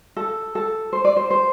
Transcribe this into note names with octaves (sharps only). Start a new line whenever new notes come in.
A4
A4
C5
D5
C5
C5